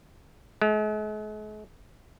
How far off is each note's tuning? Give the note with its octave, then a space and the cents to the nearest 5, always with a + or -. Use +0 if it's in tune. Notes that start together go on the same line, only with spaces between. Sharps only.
G#3 +45